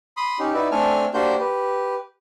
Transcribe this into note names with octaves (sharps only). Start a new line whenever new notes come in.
B5 C6 D#6
C#4 D#4 G4
D#4 E4 F#4 B4 D5 E5
A3 C4 D4 A4 G#5 F6
A#3 D4 F#4 G4 C5 G6
G4 B4